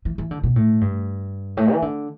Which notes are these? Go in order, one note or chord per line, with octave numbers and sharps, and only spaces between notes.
E3
E3
D3
B2
A2
G2
A2
E3
D3